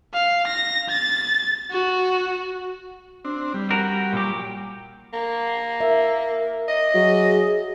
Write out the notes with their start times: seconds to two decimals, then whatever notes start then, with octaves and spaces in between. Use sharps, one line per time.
0.14 F5
0.47 A#6
0.89 A6
1.71 F#4
3.25 C4 D4
3.54 G3
3.71 F#4 A#4
4.13 A#2 F#3 G4
5.13 A#3
5.81 A#4 E5
6.68 D#5
6.94 F#3 G#4